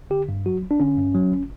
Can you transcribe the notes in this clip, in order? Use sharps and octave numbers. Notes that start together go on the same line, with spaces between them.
D3 G4
G2
F#3 F#4
G1
D4
D3 C#4
G2
F#3
G1